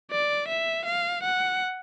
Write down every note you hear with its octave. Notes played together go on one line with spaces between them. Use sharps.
D5
E5
F5
F#5